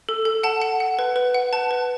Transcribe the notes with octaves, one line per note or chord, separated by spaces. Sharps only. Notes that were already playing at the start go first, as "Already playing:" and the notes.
A4
A4
F#5 A5
F#5
F#5
B4
B4
F#5
B4 A5
B4